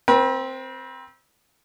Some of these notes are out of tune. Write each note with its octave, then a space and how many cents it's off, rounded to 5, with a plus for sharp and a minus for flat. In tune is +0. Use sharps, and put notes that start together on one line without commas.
C4 +0 B4 -45